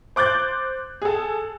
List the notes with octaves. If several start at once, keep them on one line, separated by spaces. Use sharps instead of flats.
C5 D6 F#6 G6 A6
G#4 A4